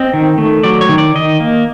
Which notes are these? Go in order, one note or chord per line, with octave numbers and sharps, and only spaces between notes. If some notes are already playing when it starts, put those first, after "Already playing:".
Already playing: C4 D#5
D#3
A3
F#3 D5
C#5
D#3
D5
D#3 D#5
A#3